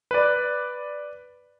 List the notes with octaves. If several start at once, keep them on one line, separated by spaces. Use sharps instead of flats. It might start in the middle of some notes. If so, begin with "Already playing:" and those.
B4 D5